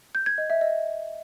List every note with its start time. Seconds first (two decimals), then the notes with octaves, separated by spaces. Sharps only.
0.15 G6
0.26 G#6
0.38 D#5
0.50 E5
0.61 D#5